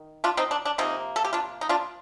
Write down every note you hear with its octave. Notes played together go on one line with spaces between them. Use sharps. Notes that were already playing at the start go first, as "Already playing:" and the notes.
Already playing: D#3
D4 F4
C4 D#4
D4
D4
C3 F3 A#3 C4 D#4
A4
G4
D4 F4
D#4
D4 F4